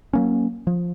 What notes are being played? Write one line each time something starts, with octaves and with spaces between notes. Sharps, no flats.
F#3 A#3 C#4
F3